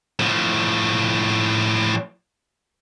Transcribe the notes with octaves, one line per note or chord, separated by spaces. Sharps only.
A2 F3